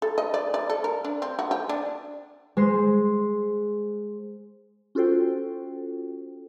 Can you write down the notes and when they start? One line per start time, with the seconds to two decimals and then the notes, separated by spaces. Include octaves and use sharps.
0.02 A4
0.18 D#5
0.34 D5
0.54 D5
0.70 A4
0.84 A#4
1.05 D4
1.22 C4
1.39 F#4
1.51 G4
1.69 D4
2.57 G#3 C5
4.95 C#4 F4 F#4 A4 C5 G5